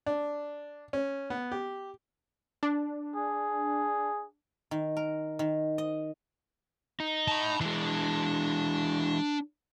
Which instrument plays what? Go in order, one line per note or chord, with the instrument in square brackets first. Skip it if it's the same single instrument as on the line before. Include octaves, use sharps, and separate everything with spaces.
[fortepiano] D4
C#4
B3
G4
[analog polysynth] D4
[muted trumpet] G#4
[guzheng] D#3
A#4
D#3
D#5
[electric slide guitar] D#4
[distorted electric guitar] A5 B5
[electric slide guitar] E3 G#3 [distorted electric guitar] D4